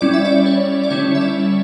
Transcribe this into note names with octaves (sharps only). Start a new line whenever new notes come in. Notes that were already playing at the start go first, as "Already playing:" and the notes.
G3 C#4 E4 D5
E5
D5
C#5
D5
D3 G3 C#4 E4 C#5
E5
D5